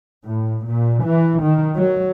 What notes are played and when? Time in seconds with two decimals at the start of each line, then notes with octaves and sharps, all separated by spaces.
0.24 A2
0.66 A#2
1.03 E3
1.42 D#3
1.76 F#3